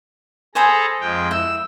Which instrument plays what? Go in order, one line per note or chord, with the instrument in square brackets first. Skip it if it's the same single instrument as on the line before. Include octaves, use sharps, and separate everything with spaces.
[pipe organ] G#4 A4 A#5 [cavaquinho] C5 G#5 B5
[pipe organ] F2 G#3 G5
[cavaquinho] E4 [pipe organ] E6